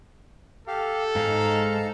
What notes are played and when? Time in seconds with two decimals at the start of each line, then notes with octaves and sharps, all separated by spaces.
0.67 G4 A4 F5
1.15 G#2 D#4 F5 A#5